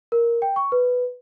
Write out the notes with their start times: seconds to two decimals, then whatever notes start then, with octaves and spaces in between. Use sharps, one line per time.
0.12 A#4
0.42 G5
0.56 C#6
0.72 B4